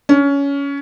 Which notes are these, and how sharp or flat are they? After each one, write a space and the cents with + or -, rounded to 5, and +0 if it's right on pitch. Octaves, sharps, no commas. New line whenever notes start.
C#4 +20